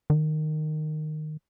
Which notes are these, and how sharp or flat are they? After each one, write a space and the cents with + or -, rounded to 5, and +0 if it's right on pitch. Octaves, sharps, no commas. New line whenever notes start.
D#3 -15